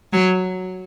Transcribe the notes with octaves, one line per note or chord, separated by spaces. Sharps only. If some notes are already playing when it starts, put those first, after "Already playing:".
F#3